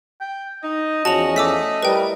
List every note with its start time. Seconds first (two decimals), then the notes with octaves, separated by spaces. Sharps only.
0.21 G5
0.64 D#4 D#5
1.05 E2 F3 C#4 F#4 A5 F7
1.36 A3 D6 E6 B6
1.82 G3 E4 A#4 B4 G5